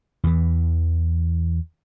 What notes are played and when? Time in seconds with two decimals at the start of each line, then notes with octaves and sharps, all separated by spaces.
0.24 E2 E3